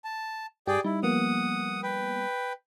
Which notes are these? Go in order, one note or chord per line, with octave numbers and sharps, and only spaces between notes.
A5
G2 G4 G#4 D5 G5
G3 D#4 E4
F3 A#3 B3 F#5 D#6
B4 G5